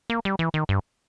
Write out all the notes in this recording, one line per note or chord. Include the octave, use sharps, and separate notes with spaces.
A#3
G3
E3
D#3
G2